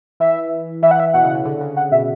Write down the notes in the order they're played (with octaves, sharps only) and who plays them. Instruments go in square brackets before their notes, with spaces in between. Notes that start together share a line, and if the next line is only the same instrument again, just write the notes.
[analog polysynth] E3 [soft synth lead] E5
[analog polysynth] E3 [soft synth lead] E5
[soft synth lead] F#5
E5
[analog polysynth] B2 [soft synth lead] F#5
[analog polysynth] C#3
C#3
D3
C#3
[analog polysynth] C#3 [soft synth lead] F#5
[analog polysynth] B2 [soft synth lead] E5